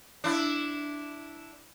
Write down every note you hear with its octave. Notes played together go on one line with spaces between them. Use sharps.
D4 E4